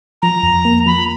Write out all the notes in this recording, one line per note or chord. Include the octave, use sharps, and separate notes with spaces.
F3 A#5
F2
A#3
F3 B5